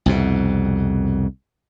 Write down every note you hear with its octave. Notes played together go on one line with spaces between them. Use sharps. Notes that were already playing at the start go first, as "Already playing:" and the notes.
C2 F2 B2